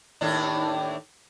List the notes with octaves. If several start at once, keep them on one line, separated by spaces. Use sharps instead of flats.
D#2 A2 D4